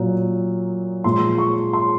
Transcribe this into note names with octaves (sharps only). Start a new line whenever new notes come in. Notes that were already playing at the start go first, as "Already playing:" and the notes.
Already playing: A#2 F#3
A#2 F3 G#3 C6
C#6
C6